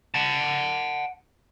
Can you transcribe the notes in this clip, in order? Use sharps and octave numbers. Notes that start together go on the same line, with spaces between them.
F#5 A5